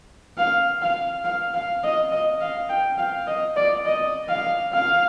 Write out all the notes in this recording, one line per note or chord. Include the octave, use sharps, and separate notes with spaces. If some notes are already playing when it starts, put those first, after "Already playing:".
F5
F5
F5
F5
D#5
D#5
F5
G5
F5
D#5
D5
D#5
F5
F5